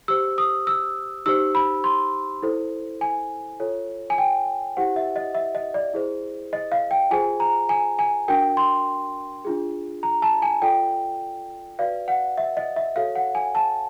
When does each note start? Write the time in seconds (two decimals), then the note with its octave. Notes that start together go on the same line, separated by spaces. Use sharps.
0.08 G4 C5 E6
0.38 D#6
0.67 E6
1.26 D#4 G4 C5 E6
1.55 B5
1.84 C6
2.43 E4 A4 C5
3.01 G#5
3.60 F4 A4 C#5
4.10 G#5
4.18 G5
4.77 E4 G4 C5 F#5
4.96 E5
5.16 D#5
5.35 E5
5.55 D#5
5.74 D5
5.94 E4 G#4 C5
6.53 D#5
6.72 F5
6.91 G5
7.11 F4 G#4 C5 G#5
7.40 A#5
7.69 G#5
7.99 G#5
8.28 D4 F#4 A#4 G5
8.57 C6
9.45 D4 F4 G#4
10.03 A#5
10.22 A5
10.42 G#5
10.62 F4 A4 D5 G5
11.79 F#4 B4 D5 F5
12.08 F#5
12.38 E5
12.57 D#5
12.76 E5
12.96 F#4 A4 C#5 F5
13.15 F#5
13.35 G#5
13.55 A5